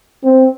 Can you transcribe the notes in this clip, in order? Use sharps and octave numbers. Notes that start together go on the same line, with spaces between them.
C4